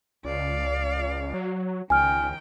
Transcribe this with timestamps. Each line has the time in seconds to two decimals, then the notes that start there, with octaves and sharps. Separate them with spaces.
0.25 C#2 D5 F5
1.34 F#3
1.90 C#2 D#3 G5 G#5 F6